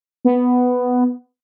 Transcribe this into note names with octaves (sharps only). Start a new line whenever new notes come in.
B3